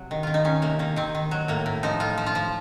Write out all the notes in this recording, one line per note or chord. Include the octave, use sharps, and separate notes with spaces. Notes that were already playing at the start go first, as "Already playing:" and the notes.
Already playing: C3 F#3
D#3
D#3 F4
D#4
D#3 C#4
C3 A#3
D#3 A#3
D#3 C4
D#3
F#3
A2 A#3
A2
F3 D#4
A2 F4
F3
F4
F3